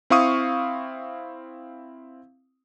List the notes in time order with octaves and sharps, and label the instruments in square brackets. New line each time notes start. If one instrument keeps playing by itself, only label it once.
[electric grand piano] C4 E4 F5 C#6 D#6 D#7